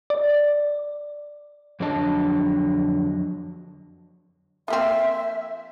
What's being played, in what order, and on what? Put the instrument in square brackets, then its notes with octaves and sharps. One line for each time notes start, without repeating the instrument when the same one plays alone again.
[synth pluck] D5
[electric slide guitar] F2 D3 F#3 D4 D#5 A5
[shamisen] F3 A#3 C4 [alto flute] E5